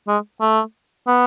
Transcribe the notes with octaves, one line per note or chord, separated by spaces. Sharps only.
G#3
A3
B3